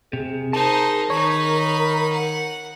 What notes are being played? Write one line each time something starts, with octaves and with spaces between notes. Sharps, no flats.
C3 G#4
D#4 A#4 C5 A5
D#3 D#4 C#5 B5
F#5